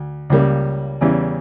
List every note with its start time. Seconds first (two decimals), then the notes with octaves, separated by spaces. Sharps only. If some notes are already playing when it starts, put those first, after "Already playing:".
Already playing: D2
0.30 C#2 C#3 G3 A#3
1.01 E2 C#3 E3 G3